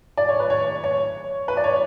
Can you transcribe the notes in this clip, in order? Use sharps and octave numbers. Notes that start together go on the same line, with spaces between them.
D5
C#5
B4
C#5
C#5
B4
D5
C#5